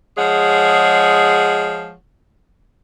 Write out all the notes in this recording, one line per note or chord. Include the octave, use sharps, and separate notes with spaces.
F3 G#3 G#4 C#5 F#5